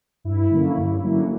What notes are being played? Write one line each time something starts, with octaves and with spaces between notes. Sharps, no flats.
G2 E4
D3 F#3 A#3 C#4
G2
D3 F#3 A#3 C#4